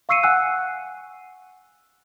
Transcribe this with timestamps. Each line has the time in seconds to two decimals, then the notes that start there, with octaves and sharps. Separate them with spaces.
0.09 F5 C#6 E6 C7 C#7 D#7
0.23 F#5 G#5 E6 F#6